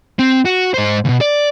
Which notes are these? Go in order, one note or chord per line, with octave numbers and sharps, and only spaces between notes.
C4
F#4
G#2 C5
D2 B2
D5